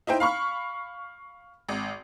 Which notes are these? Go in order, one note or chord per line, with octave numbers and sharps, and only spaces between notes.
D#4 E4 C5 G5
F5 B5 C#6 F6
G#1